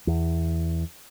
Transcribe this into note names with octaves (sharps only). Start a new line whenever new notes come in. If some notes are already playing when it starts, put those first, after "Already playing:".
E2